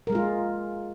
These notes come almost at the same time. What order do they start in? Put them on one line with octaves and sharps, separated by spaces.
A#4 G#3 G#4 F4